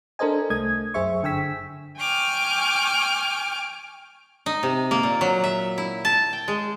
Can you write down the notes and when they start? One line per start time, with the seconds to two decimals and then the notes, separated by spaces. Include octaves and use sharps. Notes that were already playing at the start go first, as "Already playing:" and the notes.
0.19 D4 A4 A#4 C5 D#5 G#5
0.50 C2 A3 D#6 G#6
0.94 F#2 G#4 C5 E5 C#6
1.22 G1 D3 G5 G#5 E6 B6
1.99 G5 G#5 C#6 D6 F6
4.46 D#4
4.63 C3
4.91 A#3
5.03 A#2
5.21 F#3
5.44 E5
5.78 E4
6.05 A5
6.33 G5
6.48 G#3